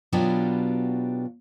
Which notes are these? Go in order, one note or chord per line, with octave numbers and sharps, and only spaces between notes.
B2 F#3 B3 D4 F4 G4